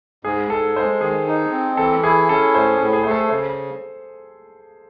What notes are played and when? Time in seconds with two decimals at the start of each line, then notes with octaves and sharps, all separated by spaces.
0.24 G#2 G#4
0.50 G#2 A4
0.77 G#3 C5
1.01 D#3 G#4
1.28 D#4
1.52 C4
1.77 E3 A4
2.03 E4 G#4
2.29 C#4 A4
2.55 A2 C5
2.74 G#4
2.80 A2
2.93 G#4
3.03 A3 C5
3.11 A4
3.30 C#3 C5